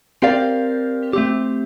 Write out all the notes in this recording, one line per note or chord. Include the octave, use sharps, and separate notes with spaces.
C4 G4 A#4 D5 F5
A3 C4 G4